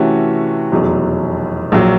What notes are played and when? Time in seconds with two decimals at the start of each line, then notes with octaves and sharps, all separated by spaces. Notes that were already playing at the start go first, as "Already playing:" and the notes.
Already playing: C3 E3 A3 C#4 F#4
0.72 F1 E2 B2 F#3
1.72 A#1 A#2 F#3